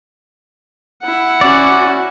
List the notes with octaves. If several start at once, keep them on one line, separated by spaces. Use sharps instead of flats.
E4 F#5
C#4 F#4 D5